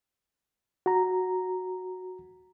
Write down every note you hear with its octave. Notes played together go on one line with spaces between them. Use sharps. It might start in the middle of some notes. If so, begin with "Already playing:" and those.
F#4 A#5